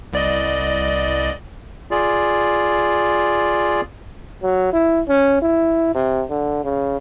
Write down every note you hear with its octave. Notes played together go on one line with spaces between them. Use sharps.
C2 D5 D#5
F4 G#4 D5
F#3
E4
C#4
E4
C3
D3
C#3